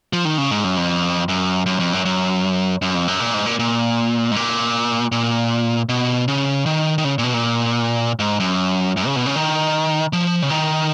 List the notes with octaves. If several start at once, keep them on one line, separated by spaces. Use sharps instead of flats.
F3
D#3
C#3
G#2
F#2
F2
F#2
F#2
F2
F#2
F#2
F#2
F2
F#2
A#2
G#2
A#2
A#2
G#2
A#2
A#2
B2
C#3
D#3
D#3
C#3
A#2
B2
A#2
G#2
F#2
F#2
C#3
B2
C#3
D#3
F3
C#3
D#3